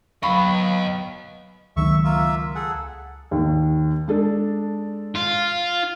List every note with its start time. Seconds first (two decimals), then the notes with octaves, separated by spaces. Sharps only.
0.23 F#3 B3 D#5 F5 B5 C#6
1.77 C#2 D#3 F#3 E5 C#6
2.04 A#3 F4 E5
2.55 G#4 A4 F#5
3.31 D#2 D#3
4.08 G#3 D4 A4
5.16 F4